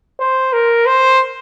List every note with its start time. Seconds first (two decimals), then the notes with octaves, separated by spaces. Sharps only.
0.20 C5
0.53 A#4
0.86 C5